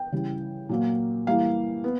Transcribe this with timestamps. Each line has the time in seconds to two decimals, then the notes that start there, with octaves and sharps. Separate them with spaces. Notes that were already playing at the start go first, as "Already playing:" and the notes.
Already playing: G5
0.12 C#3 E3 G3
0.69 A#2 F#3 A#3
1.27 E3 G3 A#3 F5
1.84 B3